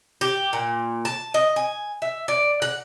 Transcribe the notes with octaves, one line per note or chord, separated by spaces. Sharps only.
G4
A#2
A5
D#5
G#5
E5
D5
F#5